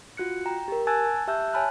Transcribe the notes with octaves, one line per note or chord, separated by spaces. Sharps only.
F4 F#4 F#6 C#7
G5 A#5
G4 A#4
G#5 A5 E6 F#6 G#6 A6
G4 E5 A5 E6 F#6 G6
C#5 G#5 A5 B5 F6 F#6